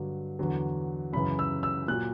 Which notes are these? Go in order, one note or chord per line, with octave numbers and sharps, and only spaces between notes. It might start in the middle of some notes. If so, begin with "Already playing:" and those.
Already playing: G2 D3 F#3
E2 D3 F#3
F#2 C#3 E3 B5
E6
E6
A#2 F#3 F#6